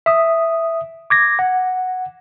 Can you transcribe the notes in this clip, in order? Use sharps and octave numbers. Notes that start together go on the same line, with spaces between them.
E5 D#6
D6 G#6 A#6
F#5